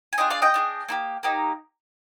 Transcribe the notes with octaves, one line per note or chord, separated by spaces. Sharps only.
G#5
D4 F4 G#4 D#5 G5
D5 F5
D#5 G5
D4 F4 G#4
A#3 D#4 G4
A#3 D#4 G4